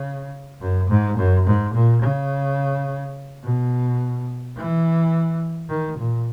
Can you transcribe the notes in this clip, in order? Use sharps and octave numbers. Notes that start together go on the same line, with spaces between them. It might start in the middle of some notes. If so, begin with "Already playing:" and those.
Already playing: C#3
F#2
G#2
F#2
G#2
A#2
C#3
B2
E3
D#3
A#2